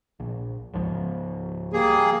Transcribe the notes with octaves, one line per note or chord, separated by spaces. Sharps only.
A#1
C#2 G#2 F3
G3 A#3 G#4